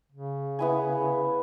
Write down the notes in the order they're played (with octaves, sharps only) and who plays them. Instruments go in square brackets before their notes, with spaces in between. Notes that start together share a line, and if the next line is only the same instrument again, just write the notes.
[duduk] C#3
[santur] B3 E4 G#5